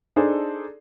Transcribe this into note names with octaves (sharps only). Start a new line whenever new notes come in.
D4 D#4 G#4 A4 C5 D5